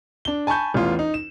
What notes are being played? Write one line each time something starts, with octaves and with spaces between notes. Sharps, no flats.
D4 G7
G#5 A5 B5 C#6 G6
A1 E2 F4
D#4
E7